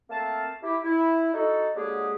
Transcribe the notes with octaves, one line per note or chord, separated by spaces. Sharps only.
A3 A#3 C4 F5 A5
E4 G4
E4
D#4 F#4 A4
D3 F#3 G#3 A#3 G4 G#4